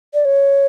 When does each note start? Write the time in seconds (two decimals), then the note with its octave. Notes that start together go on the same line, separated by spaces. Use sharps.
0.14 D5
0.25 C#5